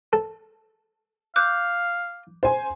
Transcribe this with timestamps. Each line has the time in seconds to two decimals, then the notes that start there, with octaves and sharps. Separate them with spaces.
0.13 A4
1.36 F5 D6 F#6 G6
2.43 C5 G#5